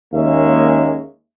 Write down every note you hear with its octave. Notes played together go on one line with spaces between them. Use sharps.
D#2 G#3 A#3 C#4 E5